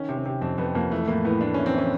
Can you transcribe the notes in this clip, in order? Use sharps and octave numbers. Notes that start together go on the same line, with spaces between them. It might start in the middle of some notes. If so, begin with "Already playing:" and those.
Already playing: D#3 C#4
C3
C4
C3
F2 C4
F2 B3
F2 A#3
E3 A3
A2 A#3
A2 B3
A2 D4
E3 C#4
C4
E3 C#4